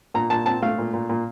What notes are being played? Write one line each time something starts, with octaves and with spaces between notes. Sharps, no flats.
A#2 A#5
A#2 A5
C4 A5
A3 F5
A#2
A#2
A#2